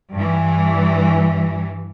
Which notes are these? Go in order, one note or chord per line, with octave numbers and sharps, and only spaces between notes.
G2 E3